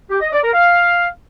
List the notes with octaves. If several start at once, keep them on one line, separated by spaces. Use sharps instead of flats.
G4
D#5
D5
A#4
F5